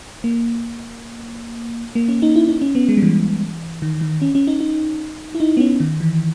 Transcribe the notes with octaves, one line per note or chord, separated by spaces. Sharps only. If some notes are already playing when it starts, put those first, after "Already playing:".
A#3
A#3
C#4
D#4
E4
D#4
C#4
B3
G#3
G3
E3
D#3
D#3
C#4
C#4
D#4
D#4
E4
D#4
B3
C#4
D#3
E3